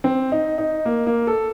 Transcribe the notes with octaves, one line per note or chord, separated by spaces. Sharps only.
C4
D#4
D#4
A#3
A#3
A4